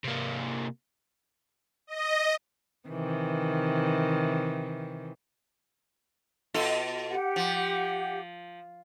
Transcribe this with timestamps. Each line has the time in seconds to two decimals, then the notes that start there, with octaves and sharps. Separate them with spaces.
0.04 C3 A#3
1.87 D#5
2.88 C3 D#3 E3
6.54 B2 F4 A4
7.09 G4 F#5
7.36 F3